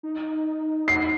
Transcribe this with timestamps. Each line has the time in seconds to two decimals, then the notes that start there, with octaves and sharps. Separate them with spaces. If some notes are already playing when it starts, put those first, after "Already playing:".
0.03 D#4
0.88 C7